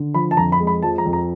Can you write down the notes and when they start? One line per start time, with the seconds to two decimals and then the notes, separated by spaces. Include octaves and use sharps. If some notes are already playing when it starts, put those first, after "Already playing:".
Already playing: D3
0.14 F3 B5
0.31 A5
0.37 F2 A#5
0.52 B5
0.60 G#3
0.67 B5
0.82 F3 A5
0.98 A#5
1.06 F2
1.13 A#5